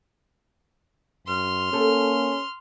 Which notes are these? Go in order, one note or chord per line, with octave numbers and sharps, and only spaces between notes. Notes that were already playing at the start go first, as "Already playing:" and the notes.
F#2 C6 F6
A#3 C#4 G4 A4